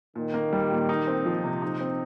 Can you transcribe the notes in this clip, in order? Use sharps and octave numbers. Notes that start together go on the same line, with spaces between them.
A#2 D#3
A#3
G3
A#2
D#4
C4
F3
C3
D#4
C4